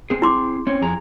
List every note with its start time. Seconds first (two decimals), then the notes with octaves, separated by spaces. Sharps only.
0.10 C4 G#4
0.22 E4 C6 D6
0.67 C4 C#4
0.82 F2 G#4 A#5